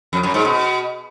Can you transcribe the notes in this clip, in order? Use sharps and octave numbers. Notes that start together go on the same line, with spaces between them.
F2
F#2
G#2
B2